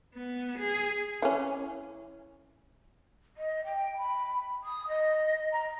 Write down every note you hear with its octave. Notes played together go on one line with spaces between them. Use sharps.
B3
G#4
E3 C#4
D#5
G5
B5
D#6
D#5
A#5